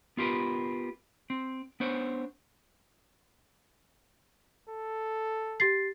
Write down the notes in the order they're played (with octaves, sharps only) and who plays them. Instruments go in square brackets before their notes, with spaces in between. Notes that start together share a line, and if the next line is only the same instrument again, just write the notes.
[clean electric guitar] B3 F4 G4 A#4 B4
C4
B3 D4 C5 C#5
[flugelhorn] A4
[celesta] G4 A6 C7